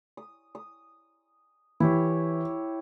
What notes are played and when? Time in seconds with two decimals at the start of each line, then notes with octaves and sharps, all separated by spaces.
0.17 D#6
0.55 D#6
1.80 E3 E4 G4 C#5